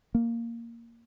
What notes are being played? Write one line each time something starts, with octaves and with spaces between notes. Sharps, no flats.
A#3